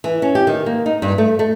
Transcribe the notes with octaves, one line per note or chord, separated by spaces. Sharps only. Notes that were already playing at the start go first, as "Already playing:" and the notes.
E3
C#4
G4
D#3
A#3
D#4
G2
A3
A3